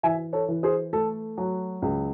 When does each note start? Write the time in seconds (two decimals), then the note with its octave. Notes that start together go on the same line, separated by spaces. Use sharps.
0.03 E3 E5 G#5
0.33 A4 C#5
0.48 E3
0.63 G#4 C5
0.93 A3 A4
1.38 F#3
1.82 C#2